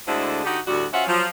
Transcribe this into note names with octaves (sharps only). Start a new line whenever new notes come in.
D2 D3 G#3 D4 E4 C5
D3 D#4 F#4 G4
D2 A2 D3 G3 F#4
C#4 F4 F#4 C5 E5 F#5
F3 F#3